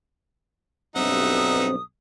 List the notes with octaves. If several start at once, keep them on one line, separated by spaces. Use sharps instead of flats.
B1 G2 C4 D#4 E5 F#5 D#6